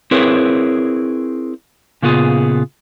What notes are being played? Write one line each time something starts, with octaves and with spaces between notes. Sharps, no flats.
C4 E4 G#4 A#4 B4 C#5
A#2 C#3 B3 F4 G#4